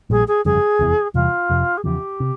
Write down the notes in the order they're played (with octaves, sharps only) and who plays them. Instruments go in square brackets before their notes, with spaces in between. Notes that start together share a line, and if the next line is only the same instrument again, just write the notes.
[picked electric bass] A#1 A#2 G3 [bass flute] G#4
[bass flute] G#4
[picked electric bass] G1 F2 C#3 G3 [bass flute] G#4
[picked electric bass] F1 E2 E3
[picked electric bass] E2 C3 E3 G3 [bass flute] F4
[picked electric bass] F1 F2 C3
[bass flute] G#4
[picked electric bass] E2 C#3 F3 [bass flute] G4
[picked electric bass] C3